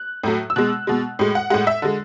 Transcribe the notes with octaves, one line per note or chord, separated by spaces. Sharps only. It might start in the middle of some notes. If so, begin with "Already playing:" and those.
Already playing: F#6
A2 F#3 A3
E6
B2 G#3 F#6
B2 G#3
A2 G#3
F#5
A2 G#3 F#5
E5
D3 G#3